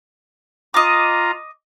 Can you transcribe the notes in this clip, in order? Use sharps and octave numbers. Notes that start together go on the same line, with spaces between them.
F4 D#5 A#5 D6